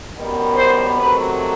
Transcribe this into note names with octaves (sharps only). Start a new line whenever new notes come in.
F#2 D#3 G3 B3
C5
C3 D#3 F#3 A3 B4